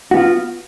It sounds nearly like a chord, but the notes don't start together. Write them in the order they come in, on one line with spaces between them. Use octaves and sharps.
F#4 B3 F4